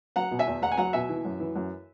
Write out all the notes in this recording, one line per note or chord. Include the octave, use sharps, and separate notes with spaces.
F#3 F#5 A#5
B2
E5 G#5
E2
E2 F#5 A#5
G#5
F#3 F#5 A#5
B2 E5 G#5
E3
F#2
E3
F#2